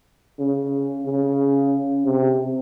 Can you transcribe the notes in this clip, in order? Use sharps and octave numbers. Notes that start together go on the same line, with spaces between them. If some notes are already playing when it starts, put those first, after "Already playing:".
C#3
C#3
C3